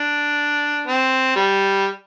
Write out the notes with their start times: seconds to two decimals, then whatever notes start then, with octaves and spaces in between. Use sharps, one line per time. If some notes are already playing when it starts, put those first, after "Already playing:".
Already playing: D4
0.87 C4
1.36 G3